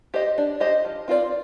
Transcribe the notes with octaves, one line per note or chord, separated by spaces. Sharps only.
G4 C5 D#5
D4
G4 C5 D#5
F3
C4 F4 A#4 D5